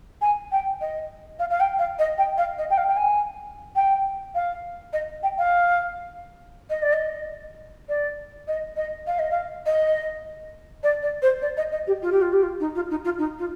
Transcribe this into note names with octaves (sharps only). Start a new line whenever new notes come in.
G#5
G5
D#5
F5
F5
G5
F5
D#5
G5
F5
D#5
G5
F5
G5
G#5
G5
F5
D#5
G5
F5
D#5
D5
D#5
D5
D#5
D#5
F5
D#5
F5
D#5
D5
D5
C5
D5
D#5
D#5
G4
F4
G4
F4
G4
F4
D#4
F4
D#4
F4
D#4
F4